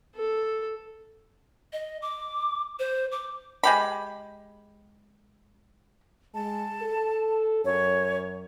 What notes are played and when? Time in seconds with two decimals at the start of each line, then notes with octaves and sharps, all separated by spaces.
0.16 A4
1.73 D#5
2.02 D6
2.79 C5
3.12 D6
3.63 G#3 G4 B5
6.34 G#3 A5
6.82 A4
7.65 F#2 C#5